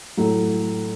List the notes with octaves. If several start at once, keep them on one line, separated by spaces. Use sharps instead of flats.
A2 F#3 A3